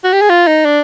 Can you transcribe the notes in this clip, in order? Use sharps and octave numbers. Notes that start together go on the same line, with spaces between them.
F#4
G4
G#4
F4
D#4
D4